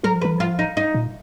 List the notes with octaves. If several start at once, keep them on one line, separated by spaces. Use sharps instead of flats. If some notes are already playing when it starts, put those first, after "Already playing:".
F#3 A#4
F3
B4
E3
F3 F4
D#4
D#4
A#2